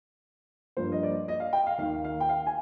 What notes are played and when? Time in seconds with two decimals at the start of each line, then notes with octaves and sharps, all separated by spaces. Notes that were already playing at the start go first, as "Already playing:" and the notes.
0.77 G2 F3 A#3 C5
0.92 D#5
1.03 D5
1.28 D#5
1.40 F5
1.53 G5
1.67 F5
1.78 D#2 D#3 A#3 F5
2.04 F5
2.20 G5
2.29 F5
2.47 G#5